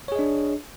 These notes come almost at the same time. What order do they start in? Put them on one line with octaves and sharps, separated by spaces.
C#5 G#4 D#5 D4